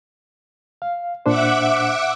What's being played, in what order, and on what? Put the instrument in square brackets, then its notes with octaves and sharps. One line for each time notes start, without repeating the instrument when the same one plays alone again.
[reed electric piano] F5
[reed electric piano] A#2 D4 C5 [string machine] E5 F#5 D6